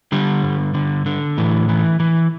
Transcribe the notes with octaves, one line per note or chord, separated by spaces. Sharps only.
D3 G3
G2
D3
D3
A2 E3
E3
E3